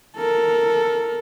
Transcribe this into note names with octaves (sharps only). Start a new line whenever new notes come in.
A4 A#4